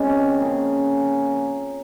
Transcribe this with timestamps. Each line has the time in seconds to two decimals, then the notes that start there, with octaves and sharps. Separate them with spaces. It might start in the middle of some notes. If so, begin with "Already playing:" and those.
Already playing: C#3 G#3 C4
0.40 F3 A#3 C#4 G#4